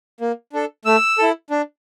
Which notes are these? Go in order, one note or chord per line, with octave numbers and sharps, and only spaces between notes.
A#3
D4 A4
A3 E6
E4 A4
D4